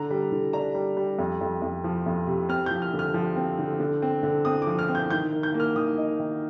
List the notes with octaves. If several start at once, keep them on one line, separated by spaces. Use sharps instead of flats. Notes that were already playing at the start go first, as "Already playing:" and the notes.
Already playing: D3 A#5
G3
D3
D4 A#5
G3
G3
F2
F2
F2
F3
F2
C3
C4 F6
G6
F3
F6
D3
F6
F3
C4
D3
D3
C4
D3
C4 D#6
D6
F3
F6
C4
G6
D#3 G6
D#3
G6
A#3
F6
D#3 D#6
D#4
D#3